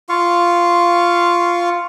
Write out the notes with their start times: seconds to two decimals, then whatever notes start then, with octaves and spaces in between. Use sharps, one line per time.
0.09 F4 F5 C#6